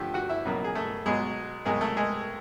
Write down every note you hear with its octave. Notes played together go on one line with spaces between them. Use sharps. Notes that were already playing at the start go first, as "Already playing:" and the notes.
Already playing: G2 D3 F3 A3 G4
F#4 F#5
E4 E5
C#2 B2 F#3 A#3
G#4
A3 A4
B1 B2 F#3 G#3 G#4
C2 B2 F#3 G#3 A#3 G#4
A3 A4
G#3 G#4